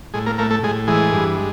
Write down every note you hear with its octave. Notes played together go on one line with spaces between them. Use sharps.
A2 G#3 G#4
A#3 A#4
A3 A#3 A#4
A3 A4
A2 G#3 G#4
E3 G#3 G#4
G2
G#3